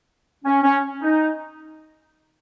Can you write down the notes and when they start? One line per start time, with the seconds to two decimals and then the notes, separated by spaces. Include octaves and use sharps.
0.45 C#4
0.63 C#4
1.02 D#4